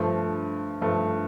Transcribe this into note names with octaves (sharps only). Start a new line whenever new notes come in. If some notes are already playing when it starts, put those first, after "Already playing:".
Already playing: G2 F3 A3
G2 F3 A3